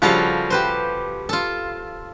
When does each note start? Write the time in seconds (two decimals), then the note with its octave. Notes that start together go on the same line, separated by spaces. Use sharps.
0.02 C#3 F3 G3 F#4 A4 F5
0.50 G4 B4 C5
1.29 F4 A4